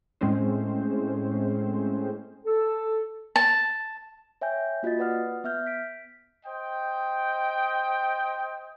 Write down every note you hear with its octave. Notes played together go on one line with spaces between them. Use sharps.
A2 G#3 C4 C#4 C5
A4
A5
C#5 E5 G5 G#5 G6
A#3 F4 F#4 D#5 A6
B4 D5 F#5 D#6 F6
B3 E5 F6 G6
B6 D7
C5 D#5 G5